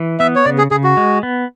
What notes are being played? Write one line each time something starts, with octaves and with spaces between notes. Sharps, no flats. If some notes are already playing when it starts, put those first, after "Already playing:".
Already playing: E3
B3 E5
C#5
C#3 D5
G#4
C#3 G#4
F#4
G#3
B3